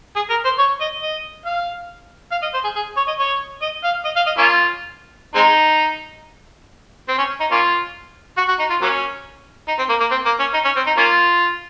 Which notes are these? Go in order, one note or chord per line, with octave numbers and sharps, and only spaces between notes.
G#4
A#4
C5
C#5
D#5
D#5
F5
F5
D#5
C5
G#4
G#4
C#5
D#5
C#5
D#5
F5
D#5
F5
D#5
A#3 C#4 F4
G#3 C4 D#4
C4
C#4
D#4
A#3 C#4 F4
F#4
F#4
D#4
F4
F#3 A#3 C#4
D#4
C4
A#3
A#3
C4
A#3
C#4
D#4
C#4
C4
D#4
A#3 C#4 F4